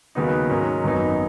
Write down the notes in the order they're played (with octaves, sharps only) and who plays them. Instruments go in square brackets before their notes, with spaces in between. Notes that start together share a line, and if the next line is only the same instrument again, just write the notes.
[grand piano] D#2 C#3 F#3 B3 D#4
G#2 D#3 F#3 C#4
G#1 F#2 F#3 B3 D#4